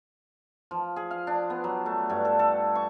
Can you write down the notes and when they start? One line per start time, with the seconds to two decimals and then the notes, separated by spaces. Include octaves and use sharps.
0.71 F3
0.96 G#4
1.11 F5
1.27 D4
1.50 B3
1.64 F#3
1.86 A3
2.10 G2
2.25 A4
2.39 A4
2.75 C#6